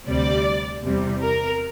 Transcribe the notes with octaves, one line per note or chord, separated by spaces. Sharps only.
D2 C3 G3 D5
E2 C3 G3
A#4